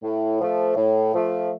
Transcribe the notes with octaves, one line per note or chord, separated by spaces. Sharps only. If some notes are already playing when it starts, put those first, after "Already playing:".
A2
F3 A3
A2
F3 A3